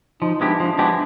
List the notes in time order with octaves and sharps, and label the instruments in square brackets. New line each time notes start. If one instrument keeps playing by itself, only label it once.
[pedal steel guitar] F3 [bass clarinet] D#4
[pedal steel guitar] G#3 B3 E4 G4 [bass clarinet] D4
[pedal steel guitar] F3 [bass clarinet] D4
[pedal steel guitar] G#3 B3 E4 G4 [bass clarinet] D4